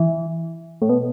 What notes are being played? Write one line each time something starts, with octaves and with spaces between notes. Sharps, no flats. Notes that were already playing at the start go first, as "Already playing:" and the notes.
Already playing: E3
A2
B2